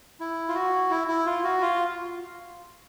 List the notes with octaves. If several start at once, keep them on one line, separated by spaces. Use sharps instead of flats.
E4
F4
F#4
E4
E4
F4
F#4
F4